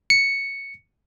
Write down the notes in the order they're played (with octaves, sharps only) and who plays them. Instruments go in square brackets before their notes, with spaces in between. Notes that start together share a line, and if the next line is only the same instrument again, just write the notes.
[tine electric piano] C#7